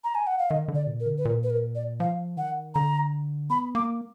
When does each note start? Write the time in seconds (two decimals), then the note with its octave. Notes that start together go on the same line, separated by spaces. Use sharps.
0.04 A#5
0.15 G#5
0.27 F#5
0.39 F5
0.50 D#3 D#5
0.68 D3
0.75 D5
0.87 A#2
1.00 A#4
1.06 D3
1.18 B4
1.25 A#2 A#4
1.43 B4
1.50 A#4
1.75 D5
2.00 F3 F5
2.37 D#3 F#5
2.75 D3 A#5
3.50 B3 B5
3.75 A#3 D6